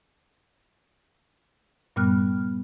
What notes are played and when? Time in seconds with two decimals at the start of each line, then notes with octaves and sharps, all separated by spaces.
1.96 G2 A#2 G3 B3 F6 F#6